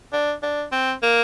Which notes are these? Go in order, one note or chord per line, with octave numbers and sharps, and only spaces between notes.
D4
D4
C4
A#3